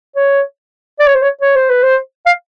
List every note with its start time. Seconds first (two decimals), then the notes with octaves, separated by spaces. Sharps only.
0.16 C#5
1.00 D5
1.07 C#5
1.15 C5
1.22 C#5
1.41 C#5
1.55 C5
1.70 B4
1.83 C5
2.26 F5